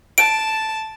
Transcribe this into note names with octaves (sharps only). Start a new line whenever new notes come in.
A5 D7